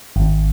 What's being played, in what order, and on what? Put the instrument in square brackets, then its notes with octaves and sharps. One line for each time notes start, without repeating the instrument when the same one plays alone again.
[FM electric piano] G#1